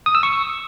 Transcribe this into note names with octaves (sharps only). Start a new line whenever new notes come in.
D#6
E6
C#6